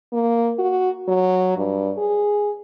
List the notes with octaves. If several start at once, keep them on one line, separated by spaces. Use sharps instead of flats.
A#3
F#4
F#3
G2
G#4